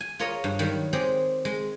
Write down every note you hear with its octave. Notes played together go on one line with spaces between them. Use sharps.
G#5
F4 G#4 A#4 C#5 D#5
G2
D#3 F#3 G3
G#3 C4 G4 G#4
G#3